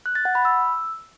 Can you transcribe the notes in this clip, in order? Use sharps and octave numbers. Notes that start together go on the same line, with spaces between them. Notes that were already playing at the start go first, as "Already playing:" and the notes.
F#6
A6
F#5
B5
E6